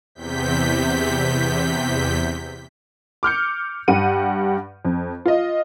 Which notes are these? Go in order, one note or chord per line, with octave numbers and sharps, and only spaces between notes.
E2 C3 G6 B6
D6 F6 G6 C#7
G2 G4 F#5 D#7
F2
F4 D#5